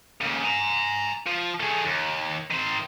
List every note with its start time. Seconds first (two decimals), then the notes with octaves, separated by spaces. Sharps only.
0.21 D#2 C#3
0.44 G#5 A#5
1.26 F3
1.60 A3 G#4
1.85 D#2
2.51 D#3 C5